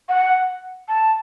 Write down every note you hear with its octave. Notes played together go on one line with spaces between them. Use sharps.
F#5
A5